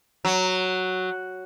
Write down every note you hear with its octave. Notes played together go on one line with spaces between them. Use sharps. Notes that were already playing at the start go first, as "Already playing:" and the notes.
F#3